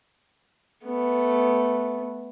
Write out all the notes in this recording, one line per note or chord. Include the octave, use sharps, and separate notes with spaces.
A3 B3